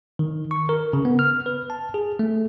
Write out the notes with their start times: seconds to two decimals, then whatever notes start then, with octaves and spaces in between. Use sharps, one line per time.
0.19 D#3
0.51 C#6
0.69 A#4
0.93 C#3
1.05 B3
1.19 F6
1.46 B4
1.70 A5
1.94 G#4
2.19 A3